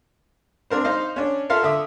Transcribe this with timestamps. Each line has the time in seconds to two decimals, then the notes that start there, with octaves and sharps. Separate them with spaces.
0.70 C4 D4 A#4 C5
0.84 D#4 C5 D#5 F5
1.16 C#4 D4
1.49 F4 A4 A#4 E5 F5
1.63 D3 E5 D#6